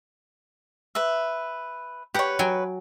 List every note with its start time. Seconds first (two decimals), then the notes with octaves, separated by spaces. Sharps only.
0.95 B4 E5
2.14 G4 B4 C#5 F#5
2.39 F#3 G5 G#5